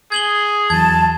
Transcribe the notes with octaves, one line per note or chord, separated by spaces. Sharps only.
G#4 G#6 F#7 G7
E2 E3 F#3 A5 G#6